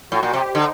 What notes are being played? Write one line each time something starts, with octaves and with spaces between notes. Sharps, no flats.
A2 F#4
A#2
C3 G4
D3 D#4